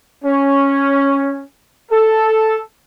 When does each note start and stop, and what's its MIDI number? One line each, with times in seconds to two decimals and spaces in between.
0.24 1.43 61
1.91 2.58 69